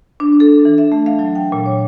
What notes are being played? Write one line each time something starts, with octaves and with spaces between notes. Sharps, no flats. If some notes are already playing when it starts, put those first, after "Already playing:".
D4
A4
E3
E5
A3
F5
F#3
G5
A#2
C#5